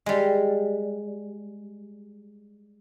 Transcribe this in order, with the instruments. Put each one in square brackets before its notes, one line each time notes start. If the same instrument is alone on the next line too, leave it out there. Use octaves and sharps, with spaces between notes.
[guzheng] G3 G#3